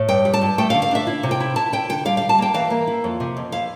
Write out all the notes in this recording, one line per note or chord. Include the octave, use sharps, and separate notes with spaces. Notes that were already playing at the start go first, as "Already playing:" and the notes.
Already playing: A2
G2 G5
G3
A5
G2
A3 G5
F5
D3
F5
D4 E5
E4
C3
G5
E4
E4 A5
E4 G5
D3 G5
G3 F5
G3 F5
A5
A#3 G5
E3 F5
A#3
E4
F2
C3
F2
E4 F5